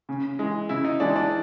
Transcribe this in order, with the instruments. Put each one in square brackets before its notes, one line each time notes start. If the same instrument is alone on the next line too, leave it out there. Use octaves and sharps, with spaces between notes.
[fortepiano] C#3
E3 G#3
[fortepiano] C#3 [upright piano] E4
[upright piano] D#4
[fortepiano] E3 G#3 [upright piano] D4
[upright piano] D4